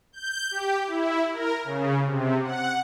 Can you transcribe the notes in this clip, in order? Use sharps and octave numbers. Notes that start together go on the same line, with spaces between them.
G6
G4
E4
A#4
C#3
C3
F#5